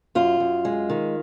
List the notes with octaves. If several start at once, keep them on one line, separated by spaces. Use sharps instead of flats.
F#2 F4
F#2
G#3
D#3